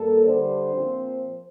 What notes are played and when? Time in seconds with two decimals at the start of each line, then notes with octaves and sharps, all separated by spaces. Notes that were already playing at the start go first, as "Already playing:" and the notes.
Already playing: G2 A#3 A4
0.25 D3 G3 D4 C5
0.75 A#2 F3 C4